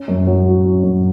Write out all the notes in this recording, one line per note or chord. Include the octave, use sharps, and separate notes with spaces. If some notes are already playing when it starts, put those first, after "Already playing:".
Already playing: C#4
F#2
F#3
F#4
C#4
F#2